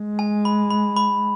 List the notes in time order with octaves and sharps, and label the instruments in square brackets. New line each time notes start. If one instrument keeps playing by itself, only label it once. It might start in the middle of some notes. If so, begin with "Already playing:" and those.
Already playing: [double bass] G#3
[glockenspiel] G#5
B5
B5
B5